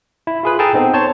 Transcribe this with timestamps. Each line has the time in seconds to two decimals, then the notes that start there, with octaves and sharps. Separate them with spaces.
0.27 E4
0.43 F4 G#4 B4
0.59 G#4 A4 G5 A5 A#5
0.74 B3 C4 D#4
0.93 C5 C#5 A5